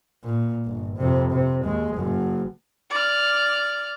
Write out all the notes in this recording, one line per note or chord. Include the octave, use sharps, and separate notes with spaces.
A#2
G1
F2 C3
C3
D#2 G#3
F#1 F#2
D5 F6